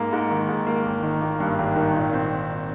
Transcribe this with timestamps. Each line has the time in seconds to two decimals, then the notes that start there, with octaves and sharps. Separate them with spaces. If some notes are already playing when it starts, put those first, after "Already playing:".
Already playing: G#2 A#3
0.13 G#2
0.31 D#3
0.49 G#2
0.67 A#3
0.85 G#1
1.03 D#3
1.21 A#3
1.40 G2
1.58 G#1
1.76 D#3
1.94 A#2
2.13 C4